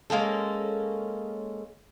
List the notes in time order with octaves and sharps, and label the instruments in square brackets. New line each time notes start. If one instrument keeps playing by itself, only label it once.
[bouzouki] G#3 A#3 C#4 A4